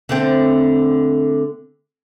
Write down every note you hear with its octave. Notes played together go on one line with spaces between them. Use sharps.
D3 A3 C4